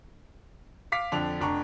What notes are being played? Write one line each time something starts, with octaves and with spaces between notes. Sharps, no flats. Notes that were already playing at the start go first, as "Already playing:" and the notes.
F5 D6 B6
F2 D3 D4 F7
F1 D4 A#5 C#6